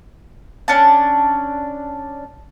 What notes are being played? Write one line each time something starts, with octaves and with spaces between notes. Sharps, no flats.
C#4 D4 A5